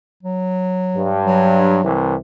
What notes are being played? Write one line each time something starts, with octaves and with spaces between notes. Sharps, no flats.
F#3
G2
F#3
C2 C3 E3